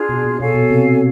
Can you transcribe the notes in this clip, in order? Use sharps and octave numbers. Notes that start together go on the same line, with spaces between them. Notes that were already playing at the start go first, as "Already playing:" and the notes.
Already playing: D4 F4 G#4
B2
A#2
B2 A4 C#5 F5 G#5
B2
C3